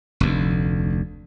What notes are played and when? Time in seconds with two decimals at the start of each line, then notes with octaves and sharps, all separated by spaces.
0.20 F1 D2